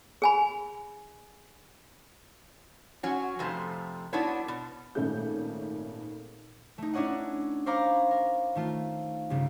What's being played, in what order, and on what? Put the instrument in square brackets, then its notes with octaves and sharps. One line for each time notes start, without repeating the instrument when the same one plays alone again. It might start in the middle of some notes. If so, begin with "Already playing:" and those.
[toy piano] G#4 G#5 B5
[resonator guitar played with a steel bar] F#3 C#4 F#4
F2 C3 F3 A3
F#3 B3 D4 E4 C#5
B2
[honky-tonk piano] G#1 A#2 A3 C#4 G#4 G6
[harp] A3 D#4
C#4 D4 E4 C#5 D#5 F#5
C5 C#5 F5 A#5 B5 D6
A#4
D#3 A3 F4
G1 C#3